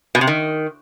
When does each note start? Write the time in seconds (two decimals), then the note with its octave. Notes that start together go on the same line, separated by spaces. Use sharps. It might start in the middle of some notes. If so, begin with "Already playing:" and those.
0.15 B2
0.21 C3
0.27 D#3